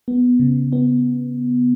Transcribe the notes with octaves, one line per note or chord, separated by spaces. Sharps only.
B3
C#3
B3